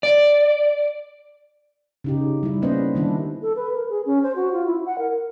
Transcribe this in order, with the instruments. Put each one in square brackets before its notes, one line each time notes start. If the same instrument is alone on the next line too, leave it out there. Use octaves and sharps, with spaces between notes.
[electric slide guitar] D5
[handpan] C#3 D#4 G4
G3 E4
A#3 B3 C#4 B4 C5 D#5
D#3 G3 D4 E4
[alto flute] A4
B4
A#4
G#4
C#4
C5
F#4
F4
E4
F#5
A#4
A#4